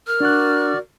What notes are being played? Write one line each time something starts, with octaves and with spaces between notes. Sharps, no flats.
A#4 F6
D4 F#4 D5 F#6